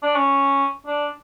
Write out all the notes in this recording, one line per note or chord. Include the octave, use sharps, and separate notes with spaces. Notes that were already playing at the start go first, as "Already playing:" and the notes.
D4
C#4
D4